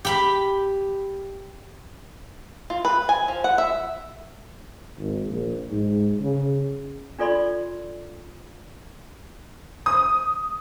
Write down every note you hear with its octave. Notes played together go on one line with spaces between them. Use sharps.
G4 B5
F4
B4
G#5
F3
F#5
E5
G#1
A#1
G#2
C#3
D4 F4 A4 D5 B5 C6
D#6